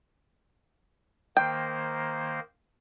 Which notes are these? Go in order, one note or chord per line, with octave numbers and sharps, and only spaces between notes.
D#3 A#3 C5 G5